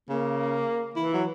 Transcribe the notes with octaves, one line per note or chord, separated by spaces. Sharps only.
C#3 A#3
E3 E4
F#3